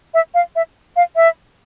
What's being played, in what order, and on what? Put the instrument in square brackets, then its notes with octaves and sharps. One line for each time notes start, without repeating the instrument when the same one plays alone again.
[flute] E5
F5
E5
F5
E5